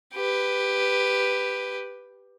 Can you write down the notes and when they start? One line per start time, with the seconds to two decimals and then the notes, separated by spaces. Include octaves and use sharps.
0.14 G4 B4